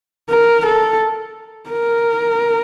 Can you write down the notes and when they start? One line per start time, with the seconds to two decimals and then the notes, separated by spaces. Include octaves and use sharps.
0.30 A#4
0.65 A4
1.71 A#4